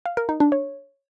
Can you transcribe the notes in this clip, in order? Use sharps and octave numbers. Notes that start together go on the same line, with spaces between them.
F5
A#4
D#4
D4
C#5